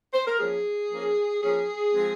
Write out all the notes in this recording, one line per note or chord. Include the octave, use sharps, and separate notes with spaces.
C5
A#4
F3 A#3 C#4 G#4
F3 A#3 C#4
F3 A#3 C#4 G#4
F3 G#3 C4